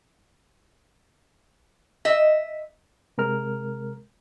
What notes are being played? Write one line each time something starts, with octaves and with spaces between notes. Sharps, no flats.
D#5 E5
C3 G#3 A#4 F6